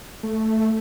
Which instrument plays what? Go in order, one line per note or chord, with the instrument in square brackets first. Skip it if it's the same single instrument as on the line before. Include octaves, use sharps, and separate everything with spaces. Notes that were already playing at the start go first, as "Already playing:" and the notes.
[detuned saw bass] A3